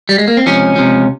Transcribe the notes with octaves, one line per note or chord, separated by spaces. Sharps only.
G3
G#3
A#3
C4
C#2 C3 F3 C#4
C#2 C3 F3